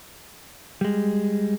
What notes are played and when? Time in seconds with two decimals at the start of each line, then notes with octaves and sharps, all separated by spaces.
0.81 G3 G#3